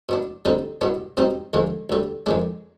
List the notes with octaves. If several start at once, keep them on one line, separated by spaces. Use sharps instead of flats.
B2 B3 D4
D2 D3 G3 C4 D#4
C2 B2 B3 D4
B2 G3 C4 D#4
D#2 D3 F3 G#3
D2 D3 G3
F2 D#3 G#3 D4